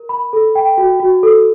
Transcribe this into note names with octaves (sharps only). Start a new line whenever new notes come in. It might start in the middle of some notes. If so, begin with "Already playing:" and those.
Already playing: A#4
B5
A4
G5
F#4
F#4
A4